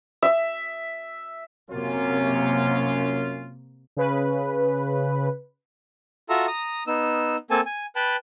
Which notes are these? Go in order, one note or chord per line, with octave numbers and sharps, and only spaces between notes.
E5
F#2 C3 A#3 C#4 F4
C#3 B4
F4 F#4 A4 E5 A#5
A#5 D#6
B3 D#4 E6
A#3 C4 A4 G#5 A5
G#5
B4 G5 A5 B5